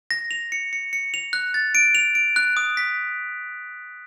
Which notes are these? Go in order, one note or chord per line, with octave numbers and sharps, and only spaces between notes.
A#6
F7
C#7
C#7
C#7
F7
F#6
A6
D7
F7
D7
F#6
D#6
B6